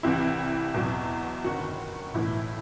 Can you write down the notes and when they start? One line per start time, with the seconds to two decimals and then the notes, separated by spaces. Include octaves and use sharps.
0.03 C2 C3 E3 E4
0.74 E2 B2 F#3
1.44 G1 F#2 D#3 F#4
2.14 B1 A2 E3 E4